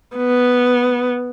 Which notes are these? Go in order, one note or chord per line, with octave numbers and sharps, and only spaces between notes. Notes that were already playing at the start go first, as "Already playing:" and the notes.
B3